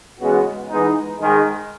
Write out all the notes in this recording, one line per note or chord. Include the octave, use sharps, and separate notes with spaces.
E2 C#3 G#3 B3 F#4
E3 G#3 B3 D#4
G#2 D#3 G#3